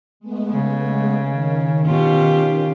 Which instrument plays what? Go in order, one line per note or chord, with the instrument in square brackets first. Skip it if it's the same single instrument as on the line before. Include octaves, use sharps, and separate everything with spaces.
[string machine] G#3 A3 B3
[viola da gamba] C#3
[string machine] D#3 C#4
[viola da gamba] B2 F4 G4